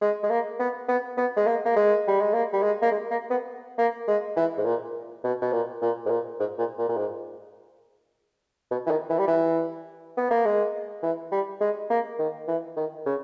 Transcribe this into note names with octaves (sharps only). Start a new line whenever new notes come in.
G#3
G#3
A#3
B3
B3
B3
G#3
A#3
A#3
G#3
G3
G#3
A#3
G3
G#3
A#3
G#3
A#3
B3
A#3
G#3
E3
G#2
A#2
B2
B2
A#2
A#2
G#2
A#2
G#2
A#2
A#2
A#2
G#2
B2
E3
D#3
E3
G3
E3
B3
A#3
G#3
E3
G3
G#3
A#3
D#3
E3
D#3
C#3